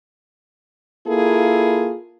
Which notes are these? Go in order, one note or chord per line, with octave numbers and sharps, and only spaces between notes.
A#3 E4 F4 G#4 A4